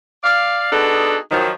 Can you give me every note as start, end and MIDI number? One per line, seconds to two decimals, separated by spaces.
0.23 0.70 74
0.23 0.70 77
0.72 1.17 59
0.72 1.17 62
0.72 1.17 63
0.72 1.17 66
0.72 1.17 68
0.72 1.17 69
1.31 1.51 51
1.31 1.51 53
1.31 1.51 54